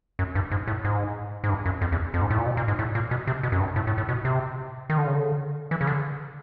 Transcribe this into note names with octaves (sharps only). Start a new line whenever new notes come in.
F#2
G2
G#2
A2
G#2
G#2
G2
F#2
F2
E2
F2
G#2
A2
A#2
B2
A#2
G#2
A2
A#2
B2
C3
B2
F#2
G2
A2
A2
A2
B2
C3
D#3
D3
C#3
D3
E3
C#3
D3